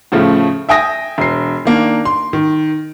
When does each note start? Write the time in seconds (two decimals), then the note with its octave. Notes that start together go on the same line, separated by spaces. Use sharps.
0.12 A2 C#3 F3 A3
0.69 E5 G5 G#5 D#6 A#6
1.18 E1 C7
1.65 D#3 A#3 D4
2.05 C6
2.33 D#3